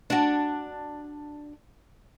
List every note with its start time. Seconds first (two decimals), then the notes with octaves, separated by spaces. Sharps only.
0.10 D4 F#4